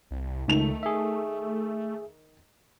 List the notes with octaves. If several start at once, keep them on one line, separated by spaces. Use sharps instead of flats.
C2
C#2 D#3 A3 F7
G#4 E5